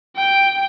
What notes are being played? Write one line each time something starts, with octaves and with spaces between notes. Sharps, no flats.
G5